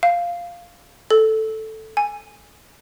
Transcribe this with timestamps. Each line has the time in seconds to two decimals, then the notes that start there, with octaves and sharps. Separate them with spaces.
0.03 F5
1.10 A4
1.97 G#5